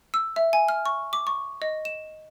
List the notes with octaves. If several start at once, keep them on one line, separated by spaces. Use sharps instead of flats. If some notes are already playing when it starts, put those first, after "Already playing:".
E6
E5
G#5
F6
C#6
D6
C#6
D#5
E7